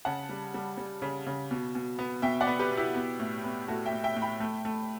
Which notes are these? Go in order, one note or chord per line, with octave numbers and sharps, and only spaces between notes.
C#3 F#5 A5
G3
G3
G3
C#3
C#3
B2
B2
B3
B2 E5 G5
D5 F#5
B3
G4 B4
B2
E4 G4
B3
A2
B3
A2 F#4 A4
E5 G5
A2
E5 G5
A2
G5 B5
A3
A3